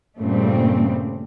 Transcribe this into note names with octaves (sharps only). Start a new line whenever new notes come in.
G2 A#2 C#3 G3 A3 C4